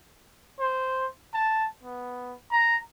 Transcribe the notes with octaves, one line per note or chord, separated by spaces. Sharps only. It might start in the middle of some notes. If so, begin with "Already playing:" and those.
C5
A5
B3
A#5